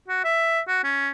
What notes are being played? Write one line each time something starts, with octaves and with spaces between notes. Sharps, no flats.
F#4
E5
F#4
C#4